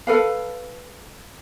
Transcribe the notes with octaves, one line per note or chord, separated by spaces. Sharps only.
A4 B4 F5